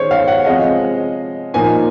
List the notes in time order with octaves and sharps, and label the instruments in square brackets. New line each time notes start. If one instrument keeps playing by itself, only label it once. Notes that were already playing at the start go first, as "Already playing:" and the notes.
Already playing: [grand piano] D#3 G#3 C#4 [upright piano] C5 C#5
[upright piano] F5
F#5
[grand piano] C3 F3 G#3 [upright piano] D#5
[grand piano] A#2 F3 A#3 D#4 [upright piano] G#5